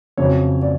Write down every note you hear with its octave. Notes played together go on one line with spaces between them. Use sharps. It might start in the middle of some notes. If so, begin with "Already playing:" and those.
F2 C#3 F#3 C#5
D5